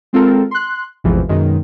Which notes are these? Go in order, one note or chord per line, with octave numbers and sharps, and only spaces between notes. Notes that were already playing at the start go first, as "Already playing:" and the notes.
G#3 C4 F4 A4 A#4
C6 F#6
A1 E2 G#2 C3 E3 F3
F#2 B2 D#3 G#3